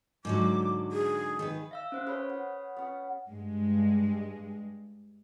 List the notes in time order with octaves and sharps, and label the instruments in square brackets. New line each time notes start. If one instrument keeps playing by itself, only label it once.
[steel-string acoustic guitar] G#2 D3 F#3 [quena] D6
[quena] G#4
[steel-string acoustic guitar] D#3 G#4 B4
[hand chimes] E5 F5 E6
C#4 C5 F#5
[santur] G#4 B4 [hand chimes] C#5 B5 F6
[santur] F#5
B3 C#4
[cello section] G2 G#3